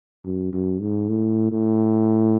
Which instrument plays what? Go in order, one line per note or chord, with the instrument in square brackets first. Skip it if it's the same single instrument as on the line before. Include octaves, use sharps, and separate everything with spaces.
[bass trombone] F#2
F#2
G#2
A2
A2